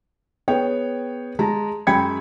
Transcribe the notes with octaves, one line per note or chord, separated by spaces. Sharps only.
B3 G#4 C#5 G5
G#3 A5 A#5
F#2 G#3 G5 B5 G#6 C#7